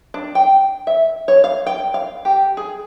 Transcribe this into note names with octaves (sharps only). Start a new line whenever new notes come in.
D4
G5
E5
C#5
F5
G5
F5
G4
G#4